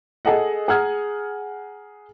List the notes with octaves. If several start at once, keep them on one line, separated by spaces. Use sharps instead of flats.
G#4 A4 D#5 F#5
G#4 F#5 A#5 D#6 F6 G#6